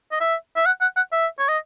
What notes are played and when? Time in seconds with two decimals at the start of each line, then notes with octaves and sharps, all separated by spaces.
0.12 D#5
0.20 E5
0.56 E5
0.66 F#5
0.81 F#5
0.96 F#5
1.12 E5
1.39 C#5
1.49 D#5